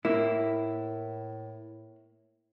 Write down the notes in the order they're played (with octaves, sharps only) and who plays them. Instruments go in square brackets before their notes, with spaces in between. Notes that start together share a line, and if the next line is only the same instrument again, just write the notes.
[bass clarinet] A2 [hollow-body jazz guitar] A#3 E4